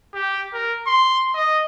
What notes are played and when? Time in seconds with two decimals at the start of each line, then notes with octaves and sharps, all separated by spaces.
0.14 G4
0.53 A#4
0.87 C6
1.35 D#5